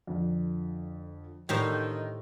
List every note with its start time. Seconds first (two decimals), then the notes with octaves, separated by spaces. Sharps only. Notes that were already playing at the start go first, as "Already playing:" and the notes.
0.07 F2 D3
1.49 A2 D3 D#3 D#4 G4 C5